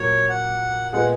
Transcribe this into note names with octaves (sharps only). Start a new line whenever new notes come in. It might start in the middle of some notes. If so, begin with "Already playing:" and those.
Already playing: A#2 F#3 A#3 C#5
F#5
A#2 G#3 B3 F4 G#4 F#5